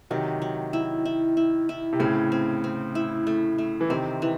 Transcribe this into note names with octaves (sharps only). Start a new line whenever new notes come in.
C3 D#3 F#3
F#3
E4
E4
E4
E4
C3
A2 C#3 C4
C4
C4
E4
A3
A3
E3
C3 D#3 C4
E3